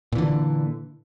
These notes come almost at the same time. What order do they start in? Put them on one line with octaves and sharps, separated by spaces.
A#2 E3 D3